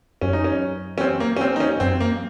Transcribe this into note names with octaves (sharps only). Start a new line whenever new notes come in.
F#2 C#4
D#4
C#4
C#4
C4
A#3
C#4
C4
D#4
C#4
F#2 C4
A#3